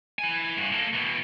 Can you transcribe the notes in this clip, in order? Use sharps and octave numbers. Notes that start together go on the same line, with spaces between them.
E4 G#5
G2 F#4
A#3 A4
B2 E3